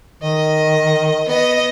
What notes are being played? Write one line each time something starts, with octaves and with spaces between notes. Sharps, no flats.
D#3 D#5
B3 D#5